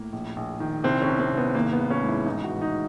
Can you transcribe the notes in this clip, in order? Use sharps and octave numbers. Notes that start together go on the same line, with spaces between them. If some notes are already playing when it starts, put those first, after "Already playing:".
Already playing: A2 A#3
A#1
A#1
D#3
C2 C4
C#4
C2
C4
C2
B3
G#1 A#3
B3
G#1
C#4
G#2
E4
A1 D#4
F#4
A1
D#4